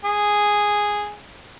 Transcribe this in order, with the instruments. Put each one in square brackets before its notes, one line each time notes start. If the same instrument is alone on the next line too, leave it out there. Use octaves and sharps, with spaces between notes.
[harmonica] G#4